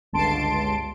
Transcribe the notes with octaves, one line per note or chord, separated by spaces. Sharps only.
G1 C#2 A5 C6 D7